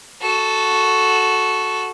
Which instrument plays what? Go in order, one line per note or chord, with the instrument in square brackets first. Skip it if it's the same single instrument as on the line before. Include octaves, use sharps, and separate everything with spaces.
[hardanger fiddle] F#4 A4